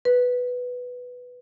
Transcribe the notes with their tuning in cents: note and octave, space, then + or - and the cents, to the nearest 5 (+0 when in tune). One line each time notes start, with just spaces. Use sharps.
B4 +0